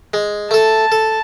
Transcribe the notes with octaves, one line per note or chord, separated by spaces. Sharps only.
G#3
A3 A4 A5
A4